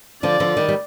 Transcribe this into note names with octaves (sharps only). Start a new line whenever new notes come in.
D3 F3 D5
D3 F3
D#3 G3
G3